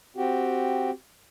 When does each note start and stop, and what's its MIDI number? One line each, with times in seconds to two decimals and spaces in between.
0.16 0.91 60
0.16 0.91 66
0.16 0.91 67